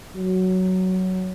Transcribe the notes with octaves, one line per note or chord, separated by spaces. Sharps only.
F#3